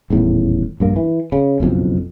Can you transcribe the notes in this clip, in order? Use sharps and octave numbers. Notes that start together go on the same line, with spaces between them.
D#1 E2 A2
A#1 G2 A#3
E3
C#3
F#1 B1 F2